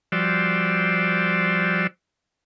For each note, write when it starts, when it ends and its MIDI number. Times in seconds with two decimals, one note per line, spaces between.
0.12 1.87 53
0.12 1.87 55
0.12 1.87 66
0.12 1.87 72
0.12 1.87 74
0.12 1.87 88